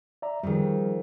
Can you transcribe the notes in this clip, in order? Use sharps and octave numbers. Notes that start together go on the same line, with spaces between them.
D5 E5 A#5
F2 D#3 G3 G#4